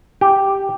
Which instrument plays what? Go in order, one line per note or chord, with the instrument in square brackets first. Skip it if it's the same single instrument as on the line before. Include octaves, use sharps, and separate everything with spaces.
[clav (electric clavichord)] G4